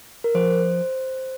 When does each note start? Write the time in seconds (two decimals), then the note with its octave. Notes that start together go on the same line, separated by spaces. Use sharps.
0.24 A#4
0.34 F3 C5